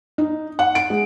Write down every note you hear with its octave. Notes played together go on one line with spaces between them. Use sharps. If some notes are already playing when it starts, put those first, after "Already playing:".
D#4
F#5
D7
G#3